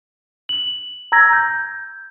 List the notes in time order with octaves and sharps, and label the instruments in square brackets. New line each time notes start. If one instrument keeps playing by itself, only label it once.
[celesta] F#7
A#5 E6 G#6 A#6
G6